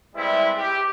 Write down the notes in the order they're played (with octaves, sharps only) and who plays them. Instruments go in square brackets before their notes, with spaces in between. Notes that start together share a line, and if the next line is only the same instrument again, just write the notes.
[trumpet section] G3 G#3 C4 E4 B4 E5
G4